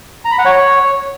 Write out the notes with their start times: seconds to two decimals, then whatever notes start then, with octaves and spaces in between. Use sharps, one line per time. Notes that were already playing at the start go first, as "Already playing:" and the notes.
0.25 A#5
0.32 B5
0.39 F#5
0.45 C#5